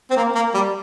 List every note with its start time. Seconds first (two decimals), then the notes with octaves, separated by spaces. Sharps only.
0.10 C4
0.16 A#3
0.35 A#3
0.54 G3